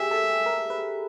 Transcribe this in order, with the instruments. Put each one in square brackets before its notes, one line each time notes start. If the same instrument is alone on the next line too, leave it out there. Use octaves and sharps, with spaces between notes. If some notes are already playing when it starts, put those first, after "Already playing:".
Already playing: [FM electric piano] G4 G#4 [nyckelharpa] E5
[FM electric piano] A4
A#4
B4